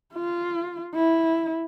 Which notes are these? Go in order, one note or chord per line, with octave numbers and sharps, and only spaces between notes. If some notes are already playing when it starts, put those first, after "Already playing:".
F4
E4